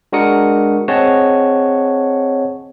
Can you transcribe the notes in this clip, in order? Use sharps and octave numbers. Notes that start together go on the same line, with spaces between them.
G#3 D4 F#4 A#4 D#6 C#7
C4 G#4 C#5 D#5 F#5 A5